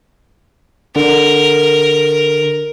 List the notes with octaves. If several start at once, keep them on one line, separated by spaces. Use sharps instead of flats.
D3 A#4